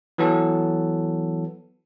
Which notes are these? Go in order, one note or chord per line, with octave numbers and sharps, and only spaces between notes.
E3 F#3 B3 A4